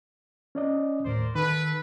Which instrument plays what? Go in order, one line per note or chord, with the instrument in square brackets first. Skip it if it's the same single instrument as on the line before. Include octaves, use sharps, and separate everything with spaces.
[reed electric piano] C#4 D5 D#5
[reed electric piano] D#2 A2 [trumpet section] A#4 C5 D5
[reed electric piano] D#3 [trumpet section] A4 B4